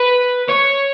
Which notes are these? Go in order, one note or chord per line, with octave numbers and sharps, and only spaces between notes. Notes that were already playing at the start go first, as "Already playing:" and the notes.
Already playing: B4
C#5